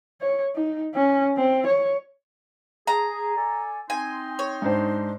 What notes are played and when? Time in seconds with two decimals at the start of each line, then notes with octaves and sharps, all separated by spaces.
0.21 C#5
0.55 D#4
0.95 C#4
1.37 C4
1.67 C#5
2.87 G#4 A#5
3.36 A4 D5 G#5
3.90 C4 D#4 G#5 C6
4.39 C#5
4.62 G#2 D4 C5